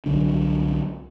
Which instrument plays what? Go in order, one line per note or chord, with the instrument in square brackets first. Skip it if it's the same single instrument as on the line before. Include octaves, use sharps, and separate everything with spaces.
[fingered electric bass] C2 D3 F#3 D4